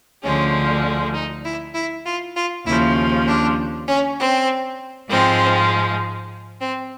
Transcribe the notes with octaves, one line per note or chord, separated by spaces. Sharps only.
D2 D3 F3 G#3 C#4
D#4
E4
E4
F4
F4
D#2 C#3 F3 E4
D4
C#4
C4
G#2 F3 G#3 C4
C4